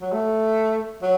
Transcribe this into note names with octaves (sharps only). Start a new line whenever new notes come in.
F#3
A3
F#3